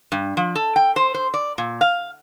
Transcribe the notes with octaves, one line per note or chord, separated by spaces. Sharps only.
G2
F3
A4
G5
C5
C5
D5
A#2
F5